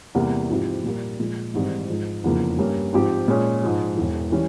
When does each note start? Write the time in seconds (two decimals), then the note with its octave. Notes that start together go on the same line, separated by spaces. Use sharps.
0.15 E2 C3 G3 A#3
0.49 G#2 F3 C4 E4 G4
0.84 A#2 G3 A#3
1.19 A#2 F3 G#3
1.54 G#1 G#2 E3 G3 C4
1.88 G#2 F3 G#3
2.24 F1 E2 C#3 F3 A#3
2.58 G2 G3 A#3 C#4
2.92 G#2 F3 C4 G4
3.28 A#2 G#3 C#4
3.62 G#2 F3 G#3
3.97 E1 E2 E3
4.32 E3 G3 C#4 E4